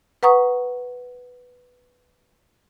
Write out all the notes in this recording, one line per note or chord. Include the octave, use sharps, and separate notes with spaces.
B4 F#5 A#5 C#6 D#6